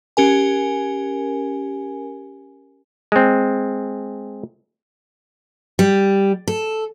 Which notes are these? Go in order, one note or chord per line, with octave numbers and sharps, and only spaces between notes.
C#4 G4 A#4 G#5
G#3 C4
G3
A4